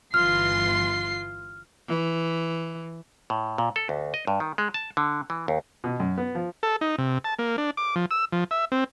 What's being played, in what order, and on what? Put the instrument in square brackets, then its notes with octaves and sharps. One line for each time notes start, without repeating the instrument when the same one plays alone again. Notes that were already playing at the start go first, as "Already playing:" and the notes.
[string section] G1 E3 C6 [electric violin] F4 C7 [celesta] F6
[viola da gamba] E3
[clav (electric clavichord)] A2
A#2
A4
D2
D#5
G2
D#3
G#3
A5
D3
E3
D#2
[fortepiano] B2
F#2
B3
F3
[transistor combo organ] A4
D#4
C3
A5
A#3
D4
D6
F3
E6
F3
E5
C4